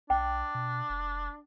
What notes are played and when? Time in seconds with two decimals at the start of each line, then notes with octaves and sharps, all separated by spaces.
0.10 B1 D4 G5
0.55 B2
0.90 F1